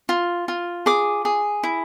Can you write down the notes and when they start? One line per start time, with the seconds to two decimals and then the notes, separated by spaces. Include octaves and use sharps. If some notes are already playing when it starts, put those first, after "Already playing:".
0.09 F4
0.48 F4
0.86 G#4 D6
1.25 G#4
1.63 E4